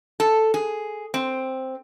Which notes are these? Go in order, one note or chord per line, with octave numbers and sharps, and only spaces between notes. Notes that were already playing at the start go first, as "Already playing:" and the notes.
A4
G#4
C4